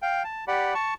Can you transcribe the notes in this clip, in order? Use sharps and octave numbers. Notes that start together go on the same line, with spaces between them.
F5 G5
A5
G4 D5 F#5 B5
A5 C#6